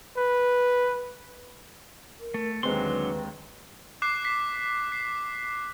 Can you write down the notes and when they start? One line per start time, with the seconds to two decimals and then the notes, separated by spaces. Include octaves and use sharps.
0.17 B4
2.20 A#4
2.34 A3
2.63 D#2 D3 F#3 G#3 C4 B4 C6
4.02 D6 F#6 C7 E7
4.25 B6 C7
4.92 C7